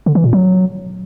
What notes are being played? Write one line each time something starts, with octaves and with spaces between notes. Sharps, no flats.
D3
E3
A#2
F#3